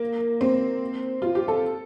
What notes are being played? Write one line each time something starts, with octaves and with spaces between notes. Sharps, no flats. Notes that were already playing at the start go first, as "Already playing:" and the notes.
Already playing: A#3
C4
F4
G4
A4